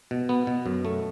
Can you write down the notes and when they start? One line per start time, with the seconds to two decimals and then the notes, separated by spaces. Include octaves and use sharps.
0.11 B2
0.29 B3
0.47 B2
0.66 F#2
0.85 A3